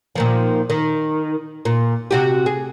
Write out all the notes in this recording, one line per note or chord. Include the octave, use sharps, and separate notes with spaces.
A#2 D#3 F3
D#3
A#2
C3 F#4 G4
G#4